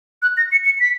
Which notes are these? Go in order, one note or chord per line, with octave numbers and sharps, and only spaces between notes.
F#6
A#6
C#7
C#7
B6